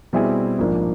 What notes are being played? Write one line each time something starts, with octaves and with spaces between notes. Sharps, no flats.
B2 G3 C4 E4 G#4
A#1 G#2 F3 A#3 D4